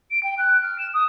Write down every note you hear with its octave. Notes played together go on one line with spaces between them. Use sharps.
D7
G5
F#6
F6
E7
D#6